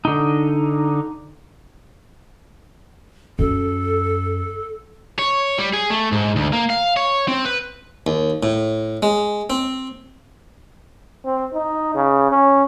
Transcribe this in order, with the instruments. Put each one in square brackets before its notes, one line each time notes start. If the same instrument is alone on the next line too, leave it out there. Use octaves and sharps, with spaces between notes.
[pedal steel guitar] D3 D#4
[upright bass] F#2 C#4 [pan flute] A4
[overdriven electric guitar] C#5
G3
G#4
A3
G#2
D2
A#3
F5
C#5
C4
B4
[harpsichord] D#2
A2
G#3
C4
[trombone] C4
D#4
C#3
C#4